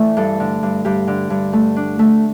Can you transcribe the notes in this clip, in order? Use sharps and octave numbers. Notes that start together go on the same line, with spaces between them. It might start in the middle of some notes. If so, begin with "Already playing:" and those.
Already playing: E3 A3 D5 E5
G2 A4
D3
G2
G2 G4
D3
G2
A3
D4
A3